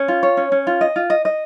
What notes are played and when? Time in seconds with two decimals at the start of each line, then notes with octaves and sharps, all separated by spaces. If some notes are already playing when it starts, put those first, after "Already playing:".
Already playing: C#4
0.08 F4
0.23 C#5
0.37 C#4
0.52 C#4
0.67 F4
0.81 D#5
0.96 F4
1.10 D#5
1.25 D#5